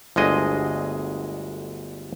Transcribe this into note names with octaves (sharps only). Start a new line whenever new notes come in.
G1 D2 G#3 D#5